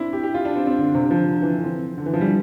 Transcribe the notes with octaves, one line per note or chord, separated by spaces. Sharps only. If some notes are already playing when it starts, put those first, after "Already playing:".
Already playing: C4 D4 E4
G4
G4
F4
D4
C4
C4
D3
C3
D3
F3
D3
D3
E3
D3
C4
D3
E3
F3
G3